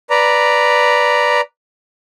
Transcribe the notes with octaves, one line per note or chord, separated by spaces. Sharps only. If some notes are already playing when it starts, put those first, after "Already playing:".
B4 D5 A#5